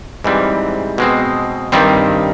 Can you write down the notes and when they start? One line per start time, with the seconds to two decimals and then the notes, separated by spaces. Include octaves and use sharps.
0.24 G#2 E3 G3 C4
0.98 B2 G#3 C4
1.72 G2 D#3 G3 C4